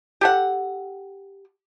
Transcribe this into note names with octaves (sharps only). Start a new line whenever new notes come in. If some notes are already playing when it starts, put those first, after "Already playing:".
G4 A4 F#5